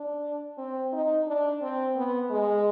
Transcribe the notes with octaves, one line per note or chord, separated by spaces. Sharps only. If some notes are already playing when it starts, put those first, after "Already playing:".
Already playing: D4
C4
D#4
D4
C4
B3
G#3